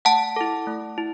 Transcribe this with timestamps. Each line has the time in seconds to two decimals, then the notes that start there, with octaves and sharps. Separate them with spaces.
0.05 A3 F#5 A5
0.36 E4 A4
0.67 A3
0.98 E4